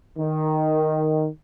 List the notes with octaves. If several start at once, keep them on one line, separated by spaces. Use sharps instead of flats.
D#3